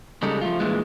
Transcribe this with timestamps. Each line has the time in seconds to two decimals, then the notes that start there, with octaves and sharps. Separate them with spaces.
0.22 C#3 G3 G#3 D#4 A4
0.41 F3 G#3 A3 F4
0.60 G2 A#2 E3 G#3